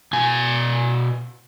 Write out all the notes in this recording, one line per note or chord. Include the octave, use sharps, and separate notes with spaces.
B2 G#5